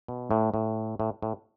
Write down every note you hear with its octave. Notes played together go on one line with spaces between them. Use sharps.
B2
A2
A2
A2
A2